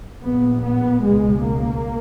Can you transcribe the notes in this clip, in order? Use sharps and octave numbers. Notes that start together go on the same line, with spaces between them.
A#1 A#2 B3
B3
C#2 B2 G#3
A#3